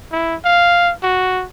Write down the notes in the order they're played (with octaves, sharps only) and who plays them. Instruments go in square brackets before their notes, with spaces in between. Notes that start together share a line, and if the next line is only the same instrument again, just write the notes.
[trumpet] E4
F5
F#4